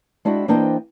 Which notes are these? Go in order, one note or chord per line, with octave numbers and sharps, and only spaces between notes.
G#3 D4 E4 F#4 G5
E3 A#3 D4 C5 D#5 G5